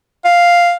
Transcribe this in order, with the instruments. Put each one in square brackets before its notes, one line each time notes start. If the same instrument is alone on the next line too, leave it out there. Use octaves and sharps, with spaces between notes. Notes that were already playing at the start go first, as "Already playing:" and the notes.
[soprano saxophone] F5